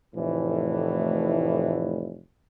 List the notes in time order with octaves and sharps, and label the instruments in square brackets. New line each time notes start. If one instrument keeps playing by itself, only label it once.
[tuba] F1 [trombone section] A2 E3